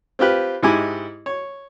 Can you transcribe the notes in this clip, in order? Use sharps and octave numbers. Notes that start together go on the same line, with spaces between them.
C4 F4 G4 B4
G#2 G#3 E4 G4 G#5 D6
C#5